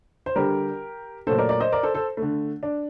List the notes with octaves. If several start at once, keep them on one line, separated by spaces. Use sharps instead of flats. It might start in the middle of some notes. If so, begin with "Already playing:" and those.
C5
D3 G3 G4 A#4
A#2 F#3 A3 A4 C5
A#4 D5
A#4 D5
C5 D#5
A#4 D5
A4 C5
A4 C5
D3 A3
D4